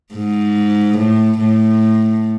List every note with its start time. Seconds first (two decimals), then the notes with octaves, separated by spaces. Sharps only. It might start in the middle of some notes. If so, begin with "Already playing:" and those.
0.14 G#2
0.98 A2
1.38 A2